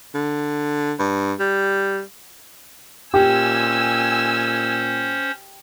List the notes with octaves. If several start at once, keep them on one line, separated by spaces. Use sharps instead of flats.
D3
G2
G3
A#2 C#4 G4 C5 G#5 E6